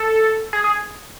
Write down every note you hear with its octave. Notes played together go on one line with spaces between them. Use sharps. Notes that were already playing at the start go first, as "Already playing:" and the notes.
Already playing: A4
G#4
G#4